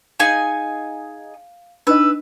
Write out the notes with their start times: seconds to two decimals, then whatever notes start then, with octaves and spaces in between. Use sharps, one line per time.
0.20 D#4 G#4 F5 G#5
1.87 D4 D#4 B4 D#5 E6